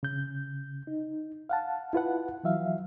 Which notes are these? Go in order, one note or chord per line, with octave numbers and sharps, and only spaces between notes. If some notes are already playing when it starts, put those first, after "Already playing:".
C#3 G6
D#4
F5 F#5 A5
E4 F4 B4 F#5
E3 F#3 E5 F5